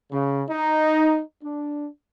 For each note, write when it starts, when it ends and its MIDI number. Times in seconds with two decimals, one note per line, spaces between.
0.11 0.42 49
0.49 1.21 63
1.42 1.86 62